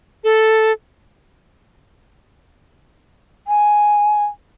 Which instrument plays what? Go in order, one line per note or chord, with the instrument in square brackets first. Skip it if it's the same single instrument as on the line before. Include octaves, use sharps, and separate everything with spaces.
[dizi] A4
[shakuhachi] G#5